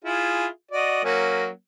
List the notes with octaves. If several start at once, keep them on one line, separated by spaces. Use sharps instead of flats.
E4 F4 G#4
F#4 D5 D#5
F#3 A#3 C#4